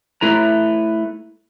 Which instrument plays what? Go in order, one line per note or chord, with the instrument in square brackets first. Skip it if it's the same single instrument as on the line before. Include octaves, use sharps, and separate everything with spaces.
[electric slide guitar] A3 E4 B4 A#5